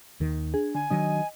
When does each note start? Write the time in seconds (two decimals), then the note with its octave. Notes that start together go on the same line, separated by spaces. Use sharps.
0.20 D#2 D#3
0.54 D4 G#4
0.75 D3 G#5
0.90 D#3 F#3 D4 D#5